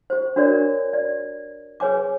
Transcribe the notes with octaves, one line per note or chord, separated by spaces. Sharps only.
G4 C5
D4 F#4 A#4 C#5 D5
D5
G#4 B4 C#5 G#5 D6